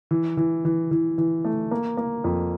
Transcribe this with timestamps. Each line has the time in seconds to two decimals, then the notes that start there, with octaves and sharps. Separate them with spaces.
0.11 E3
0.37 E3
0.65 E3
0.91 E3
1.18 E3
1.45 A3
1.71 A#3
1.97 A#3
2.24 F2